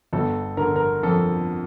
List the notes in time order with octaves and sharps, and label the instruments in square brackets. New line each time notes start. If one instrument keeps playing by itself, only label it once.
[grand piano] G1 A4
D3 A#4
A#4
F2 A4